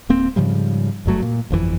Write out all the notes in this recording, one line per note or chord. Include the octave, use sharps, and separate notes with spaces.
D1 A#3 C4
G#2 C#3 F3 G3
F#1 G2 F#3 A3
A#2
G1 F2 D3 E3